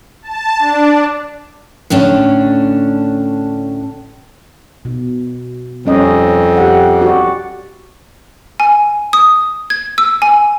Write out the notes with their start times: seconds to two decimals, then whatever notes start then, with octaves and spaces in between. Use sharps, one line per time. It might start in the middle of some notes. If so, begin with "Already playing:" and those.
0.22 A5
0.59 D4
1.90 A2 D3 C#4 D4
4.85 B2
5.86 F2 G3 C#4 D#5
6.57 G4 F#5
7.02 F#4 D5
8.60 G#5
9.13 D#6
9.70 G#6
9.98 E6
10.22 G#5